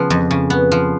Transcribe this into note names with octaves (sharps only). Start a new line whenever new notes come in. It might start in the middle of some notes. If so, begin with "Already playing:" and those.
Already playing: C#3 F3 B3
F2
C#3
B3
F3